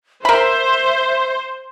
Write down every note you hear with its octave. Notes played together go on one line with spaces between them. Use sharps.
A#4 C5 E5 B5